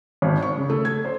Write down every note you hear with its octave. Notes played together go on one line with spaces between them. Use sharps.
G#1
C#6
C#3
A3
G#6
C5